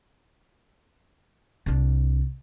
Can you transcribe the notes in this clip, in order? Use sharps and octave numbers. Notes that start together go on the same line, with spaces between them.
C2 D4